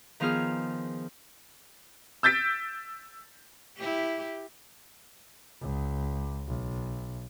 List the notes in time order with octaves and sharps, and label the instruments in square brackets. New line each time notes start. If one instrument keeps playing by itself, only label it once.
[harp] D#3 F3 B3 F4 G#4 F6
[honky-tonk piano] E6 G6 A6 B6 D7
[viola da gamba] E4 G4
[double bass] C#2
B1